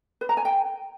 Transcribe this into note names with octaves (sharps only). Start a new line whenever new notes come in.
B4
A#5
G#5
G5